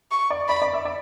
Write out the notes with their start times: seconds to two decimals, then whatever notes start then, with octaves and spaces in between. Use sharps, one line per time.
0.11 C#6
0.30 D5
0.48 D5 B5
0.62 D5
0.73 E5
0.85 D5